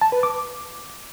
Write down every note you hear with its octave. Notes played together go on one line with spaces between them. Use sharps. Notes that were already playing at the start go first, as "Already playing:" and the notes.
A5
B4
D6